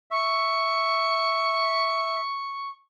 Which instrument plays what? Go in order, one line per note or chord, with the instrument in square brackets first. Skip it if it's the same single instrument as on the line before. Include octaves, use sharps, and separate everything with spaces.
[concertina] E5 [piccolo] C#6